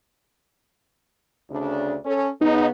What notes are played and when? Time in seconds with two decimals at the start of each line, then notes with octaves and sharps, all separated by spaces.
1.50 D2 C#3 D4
2.05 C#4 A4
2.41 C#3 B3 D#4